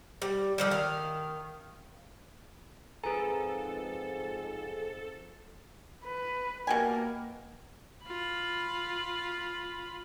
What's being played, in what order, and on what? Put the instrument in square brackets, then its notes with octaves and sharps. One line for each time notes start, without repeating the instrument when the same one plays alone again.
[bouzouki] G3
[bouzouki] D3 D#3 F3 [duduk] G3
[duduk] D#3 [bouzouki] F5
[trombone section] F2 G#2 [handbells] G#4 G#5 [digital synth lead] A4 [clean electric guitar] B4 A#5
[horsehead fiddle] B4
[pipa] B2 G4 G#5 [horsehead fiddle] A#3 A#4
[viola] F4 B5